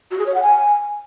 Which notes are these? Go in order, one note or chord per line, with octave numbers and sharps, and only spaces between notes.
F#4
G#4
C#5
F#5
G#5